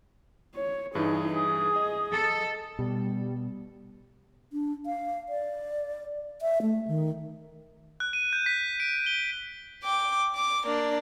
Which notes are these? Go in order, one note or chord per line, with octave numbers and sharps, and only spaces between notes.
C#5
G2 E3 D#4 G#4
G#4 D#6
D#5
A4
B2 G3
D4
F5
D5
E5
A3
D#3
F#6
D#7
G6
B6
D7
G7
G5 D6
D6
A#3 D4